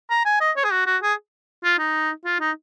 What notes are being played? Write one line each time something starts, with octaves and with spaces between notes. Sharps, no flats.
A#5
G#5
D#5
C#5
G#4
F#4
F#4
G#4
F4
D#4
F4
D#4